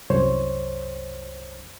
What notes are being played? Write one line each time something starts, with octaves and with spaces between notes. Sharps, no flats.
C2 F#2 C5 C#5